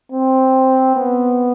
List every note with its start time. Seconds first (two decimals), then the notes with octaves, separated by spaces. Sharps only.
0.12 C4
0.96 B3